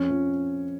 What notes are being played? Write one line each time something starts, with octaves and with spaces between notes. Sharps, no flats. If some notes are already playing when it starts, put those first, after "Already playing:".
Already playing: F2 C#4
F3